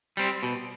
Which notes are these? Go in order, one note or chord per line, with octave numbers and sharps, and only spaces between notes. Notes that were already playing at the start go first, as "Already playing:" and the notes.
G3 C4
B2